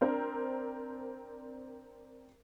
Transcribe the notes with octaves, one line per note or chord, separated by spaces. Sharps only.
C4 D4 A#4 C5